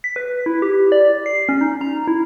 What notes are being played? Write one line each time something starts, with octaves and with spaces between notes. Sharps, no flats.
B6
B4
E4
G4
D5
C7
C#4
D#4
A#5
E4